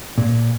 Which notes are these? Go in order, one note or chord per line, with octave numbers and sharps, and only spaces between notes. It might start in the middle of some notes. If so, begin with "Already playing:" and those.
A#2